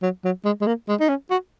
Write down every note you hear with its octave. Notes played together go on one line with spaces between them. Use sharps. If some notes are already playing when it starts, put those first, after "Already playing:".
F#3
F#3
G#3
G#3
A#3
G#3
D#4
C#4
F#4